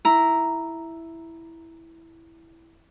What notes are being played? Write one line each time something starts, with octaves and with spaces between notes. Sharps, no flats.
E4 A#5